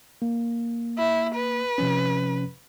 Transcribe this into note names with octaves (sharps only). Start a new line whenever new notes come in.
A#3
E4
B4
C3 F3 C#4